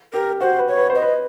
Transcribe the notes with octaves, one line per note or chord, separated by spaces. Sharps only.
G4 A#4
F#4 C5
B4
C#5
B4
C5
D#5
B4